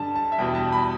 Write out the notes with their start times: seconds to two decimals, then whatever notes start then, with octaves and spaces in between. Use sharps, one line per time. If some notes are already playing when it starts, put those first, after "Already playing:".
Already playing: G2 D3 G3 A5
0.15 A5
0.32 E5
0.38 E2 B2 G3 G5
0.55 A5
0.72 B5